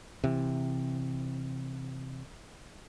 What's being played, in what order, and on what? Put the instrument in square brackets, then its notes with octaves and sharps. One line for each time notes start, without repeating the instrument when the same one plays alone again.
[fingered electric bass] C3 E3